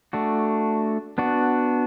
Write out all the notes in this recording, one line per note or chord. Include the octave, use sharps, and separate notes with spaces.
A3 D4 F#4
B3 D4 F#4